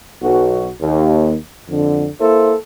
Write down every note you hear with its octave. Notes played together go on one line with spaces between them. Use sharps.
B1 F#4
D#2
F2 D3
A#3 E4 A4 C5